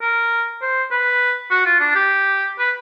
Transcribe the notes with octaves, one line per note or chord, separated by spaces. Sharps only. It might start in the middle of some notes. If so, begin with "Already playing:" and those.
A#4
C5
B4
F#4
F4
D4
G4
B4